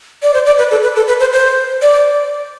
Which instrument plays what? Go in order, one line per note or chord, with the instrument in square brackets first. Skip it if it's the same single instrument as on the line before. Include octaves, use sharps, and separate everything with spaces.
[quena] D5
C5
D5
B4
A4
B4
A4
B4
C5
C5
D5